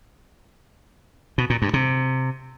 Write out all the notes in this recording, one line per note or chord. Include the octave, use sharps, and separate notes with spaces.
B2
A#2
G2
C3